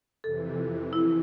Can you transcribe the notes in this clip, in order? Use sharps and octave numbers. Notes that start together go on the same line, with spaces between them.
F2 C3 E3 A4
E4